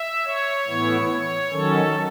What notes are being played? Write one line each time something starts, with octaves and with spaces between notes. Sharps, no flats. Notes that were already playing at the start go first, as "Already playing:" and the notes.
Already playing: E5
C#5
A2 E3 B3 E4
C#5
D#3 F#3 C#4 A4